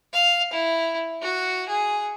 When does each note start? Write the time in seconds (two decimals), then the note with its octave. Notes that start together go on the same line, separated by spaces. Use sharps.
0.14 F5
0.53 E4
1.22 F#4
1.68 G#4